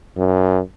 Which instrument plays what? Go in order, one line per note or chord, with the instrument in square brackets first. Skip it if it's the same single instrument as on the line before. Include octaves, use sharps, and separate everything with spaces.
[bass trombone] F#2